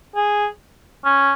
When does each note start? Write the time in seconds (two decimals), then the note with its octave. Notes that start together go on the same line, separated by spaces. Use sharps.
0.16 G#4
1.05 C#4